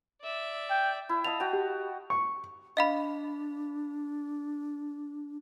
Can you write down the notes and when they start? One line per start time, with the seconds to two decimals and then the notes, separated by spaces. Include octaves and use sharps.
0.22 D5 E5
0.70 G5
1.09 E4
1.25 D#5 F5 A5 F7
1.40 F#4 G5
1.53 G4
2.10 C#6
2.77 D4 D#5 F5 B5